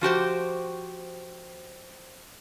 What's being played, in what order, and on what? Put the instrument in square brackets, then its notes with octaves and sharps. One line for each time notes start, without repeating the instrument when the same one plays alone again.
[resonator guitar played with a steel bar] F3 F#4 G4 C5